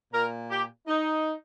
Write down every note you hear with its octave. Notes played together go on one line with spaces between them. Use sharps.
A#2 A#4
G4
D#4